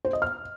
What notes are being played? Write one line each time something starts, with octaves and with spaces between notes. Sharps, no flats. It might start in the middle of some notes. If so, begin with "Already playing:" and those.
C5
D#5
F6